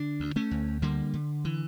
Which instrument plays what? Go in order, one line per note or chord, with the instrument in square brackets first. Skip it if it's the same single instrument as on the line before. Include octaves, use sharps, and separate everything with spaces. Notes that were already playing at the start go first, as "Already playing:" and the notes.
Already playing: [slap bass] D3 D4
D2
A3 C#4
D2
D3 G3 A#3
D3
E3